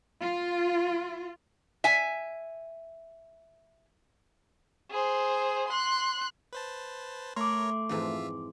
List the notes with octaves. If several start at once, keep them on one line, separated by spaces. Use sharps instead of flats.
F4
E5 G#5
G#4 C5
C6 F#6
B4 C5 A5
A3 A#4 C#5 A#5 C6 D6
F2 G#2 E3 F4 E5